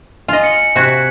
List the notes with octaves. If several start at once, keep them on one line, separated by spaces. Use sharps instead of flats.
F4 D#5 G#5
C#7 F#7
C3 F#4 F#6 G#6 B6